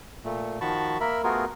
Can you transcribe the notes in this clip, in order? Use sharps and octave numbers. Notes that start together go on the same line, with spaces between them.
A#2 A3
D#3 F3 F#4 A5 B5 C#6
A#3 A#4 E5 B5
A3 B3 F4 F#4 G#4 A#4